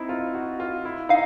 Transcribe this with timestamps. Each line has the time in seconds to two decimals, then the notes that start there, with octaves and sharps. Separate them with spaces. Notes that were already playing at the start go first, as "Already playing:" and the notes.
Already playing: C4 D#4 E4
0.09 F4
0.34 F#4
0.60 F4
0.85 E4
1.09 D#4 F5